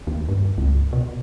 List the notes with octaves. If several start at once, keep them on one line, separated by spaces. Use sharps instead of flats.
D#2
G2
C#2
B2